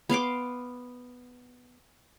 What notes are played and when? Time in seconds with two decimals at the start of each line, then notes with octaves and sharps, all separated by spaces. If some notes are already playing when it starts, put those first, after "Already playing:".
0.09 B3 F5 C6 D6